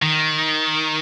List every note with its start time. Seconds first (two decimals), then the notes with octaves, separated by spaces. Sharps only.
0.02 D#3